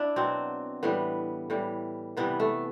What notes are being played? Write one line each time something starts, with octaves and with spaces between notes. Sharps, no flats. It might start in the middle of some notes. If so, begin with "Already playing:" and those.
Already playing: D4 E4
B2 F#3 C4
A2 E3 G3 B3
A2 E3 G3
C3 E3 G3 B3
A3